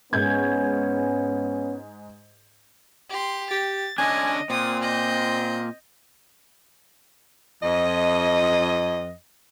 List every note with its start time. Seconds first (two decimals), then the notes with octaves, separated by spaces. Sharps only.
0.13 G#2 B3 C#4 G6 G#6
3.10 G4 C6
3.51 G4 A6
3.98 D3 C#4 D4 D#5 G#5
4.50 A#2 C4 D#6
4.82 D#5 G6
7.63 F2 D#5